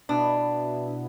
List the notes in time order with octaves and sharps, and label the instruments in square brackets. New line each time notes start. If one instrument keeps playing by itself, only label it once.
[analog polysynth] B2 B3 E4 [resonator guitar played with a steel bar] D4